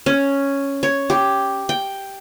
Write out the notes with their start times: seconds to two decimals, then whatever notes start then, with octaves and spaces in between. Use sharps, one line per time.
0.06 C#4
0.83 C#5
1.10 G4
1.69 G5